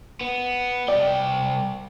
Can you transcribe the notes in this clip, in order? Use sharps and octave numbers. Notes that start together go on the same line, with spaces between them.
B3
C2 D5 G5